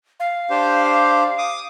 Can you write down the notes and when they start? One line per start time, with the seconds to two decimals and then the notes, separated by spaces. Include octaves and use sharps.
0.20 F5
0.50 D4 G4 C5
1.38 D6 D#6